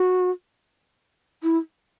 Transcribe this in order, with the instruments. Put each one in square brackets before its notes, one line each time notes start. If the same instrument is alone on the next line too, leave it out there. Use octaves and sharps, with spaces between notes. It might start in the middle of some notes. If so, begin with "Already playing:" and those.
Already playing: [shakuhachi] F#4
E4